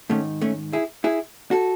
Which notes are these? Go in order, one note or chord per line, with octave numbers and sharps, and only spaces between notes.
G#2 D#3 A3 C#4
A3 C#4
E4 G#4
E4 G#4
F#4 A4